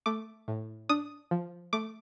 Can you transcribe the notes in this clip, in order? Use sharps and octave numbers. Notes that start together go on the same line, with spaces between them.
A3 D6
A2
D4 D#6
F3
A3 D6